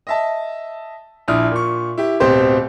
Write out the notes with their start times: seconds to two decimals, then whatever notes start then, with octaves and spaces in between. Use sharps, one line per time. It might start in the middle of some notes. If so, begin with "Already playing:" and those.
0.07 D#5 E5 A5
1.28 A#1 D4 E4 D#6 F6
1.51 A#2 C#6
1.98 E4 G4
2.20 D1 B2 C4 G4 C5 C6